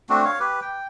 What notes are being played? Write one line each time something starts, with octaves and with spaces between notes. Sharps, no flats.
A3 C4 D4 F#4
C#5 F5
G4 B4
G5